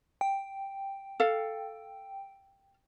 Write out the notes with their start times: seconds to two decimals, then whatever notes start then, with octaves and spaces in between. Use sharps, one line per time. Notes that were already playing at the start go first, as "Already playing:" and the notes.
0.21 G5
1.20 A4 F5